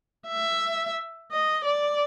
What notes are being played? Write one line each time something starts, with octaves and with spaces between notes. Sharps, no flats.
E5
D#5
D5